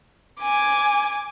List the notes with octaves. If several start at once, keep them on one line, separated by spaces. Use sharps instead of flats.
G#5 D6